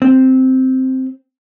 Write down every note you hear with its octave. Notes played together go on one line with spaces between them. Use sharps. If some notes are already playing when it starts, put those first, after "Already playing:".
C4